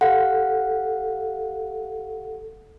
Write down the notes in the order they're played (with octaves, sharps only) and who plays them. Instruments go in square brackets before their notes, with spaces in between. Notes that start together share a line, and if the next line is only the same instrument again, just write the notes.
[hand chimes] G4 F5 F#5 [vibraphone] A4